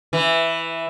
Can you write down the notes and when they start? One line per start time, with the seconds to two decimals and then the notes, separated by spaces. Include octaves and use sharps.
0.13 E3